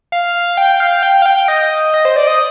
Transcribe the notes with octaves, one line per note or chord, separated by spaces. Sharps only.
F5
G5
F5
G5
F5
G5
D#5
D#5
C5
D5
D#5